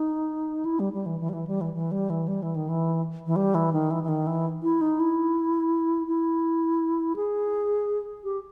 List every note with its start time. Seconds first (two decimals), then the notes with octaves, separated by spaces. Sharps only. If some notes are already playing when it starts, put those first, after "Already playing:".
Already playing: D#4
0.65 E4
0.80 G3
0.93 G3
1.06 E3
1.20 E3
1.29 G3
1.33 E3
1.47 G3
1.61 E3
1.74 E3
1.91 G3
2.10 E3
2.28 G3
2.43 E3
2.56 D#3
2.69 E3
3.26 E3
3.36 G3
3.55 E3
3.73 D#3
3.91 E3
4.03 E3
4.08 D#3
4.27 E3
4.63 E4
4.81 D#4
5.00 E4
6.07 E4
7.16 G#4
8.24 G4